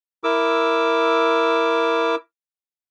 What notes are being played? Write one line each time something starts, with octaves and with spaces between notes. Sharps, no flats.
E4 A#4 D6 E6